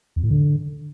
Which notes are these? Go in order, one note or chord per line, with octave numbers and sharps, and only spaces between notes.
E2
A2
D3